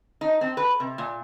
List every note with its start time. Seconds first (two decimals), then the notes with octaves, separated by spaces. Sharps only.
0.21 D#4
0.41 C4
0.57 B4
0.80 C3
0.98 A#2